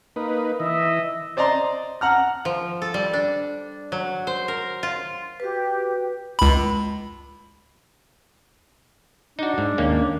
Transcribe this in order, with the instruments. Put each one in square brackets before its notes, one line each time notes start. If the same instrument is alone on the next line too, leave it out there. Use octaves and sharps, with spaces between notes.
[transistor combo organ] A#3 D#4 B4
[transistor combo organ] E3 [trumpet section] D#5 E5
[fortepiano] C5 D5 D#5 A#5 C6
F#5 A#5 F6
[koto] F3
A4
G3
D4
F#3
C5
A#4
F4
[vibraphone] F#4 B4 [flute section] G4
[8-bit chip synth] C#2 B5
[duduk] D4 [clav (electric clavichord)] D#4 F#4
[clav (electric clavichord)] G#2
D#2 A#3 C#4